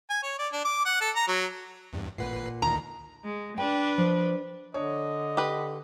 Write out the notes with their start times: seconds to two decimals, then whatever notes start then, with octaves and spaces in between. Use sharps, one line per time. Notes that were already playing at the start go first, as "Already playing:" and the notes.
0.10 G#5
0.23 C#5
0.39 D5
0.53 D4
0.65 D6
0.85 F#5
1.01 A4
1.15 A#5
1.28 F#3
1.93 E2 G2
2.18 A1 A#2 B4 F#5 C7
2.62 D2 D#3 A#5
3.24 G#3
3.58 D4 B4 G5
3.98 F3
4.74 D3 D4 C#5 D#5
5.37 G4 B4